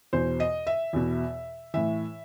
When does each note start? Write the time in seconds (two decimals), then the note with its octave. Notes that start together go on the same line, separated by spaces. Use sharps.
0.13 E2 B2 C5
0.40 D#5
0.67 E5
0.93 E2 B2
1.74 A2 E3 E5